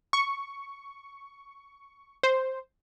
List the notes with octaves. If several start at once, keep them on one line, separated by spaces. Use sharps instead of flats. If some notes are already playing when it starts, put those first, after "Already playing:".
C#6
C5